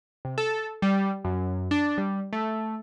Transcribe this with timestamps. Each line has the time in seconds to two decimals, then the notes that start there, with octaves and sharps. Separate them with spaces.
0.25 C3
0.38 A4
0.82 G3
1.24 F#2
1.71 D4
1.98 G3
2.33 A3